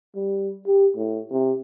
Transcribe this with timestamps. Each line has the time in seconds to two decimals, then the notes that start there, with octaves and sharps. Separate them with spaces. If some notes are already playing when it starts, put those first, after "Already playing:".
0.15 G3
0.67 G4
0.96 A2
1.32 C3